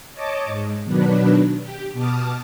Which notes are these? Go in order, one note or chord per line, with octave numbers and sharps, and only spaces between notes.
C#5 D#5 A5 D6
G#2
B2 D#3 F#3 D4 B4
G4
B2 A5 D6 D#6 F6